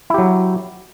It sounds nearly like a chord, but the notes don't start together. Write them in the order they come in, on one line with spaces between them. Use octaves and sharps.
E4 G4 F#3